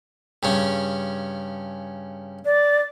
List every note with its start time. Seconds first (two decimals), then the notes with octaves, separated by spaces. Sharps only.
0.43 G2 C#3 C#4
2.45 D5